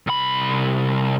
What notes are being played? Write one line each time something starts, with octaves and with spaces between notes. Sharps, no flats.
C2 B5